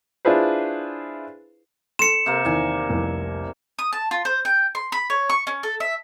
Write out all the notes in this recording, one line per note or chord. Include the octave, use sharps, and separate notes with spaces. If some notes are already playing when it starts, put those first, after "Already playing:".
D4 E4 F4 G#4 B4 C5
A4 C6 C#7 E7
C3 A#3
E2 D#3 D5 G#5
F1 C2
D#6
A5
F4
C5
G5
C6
B5
C#5
C#6
C#4
A4
E5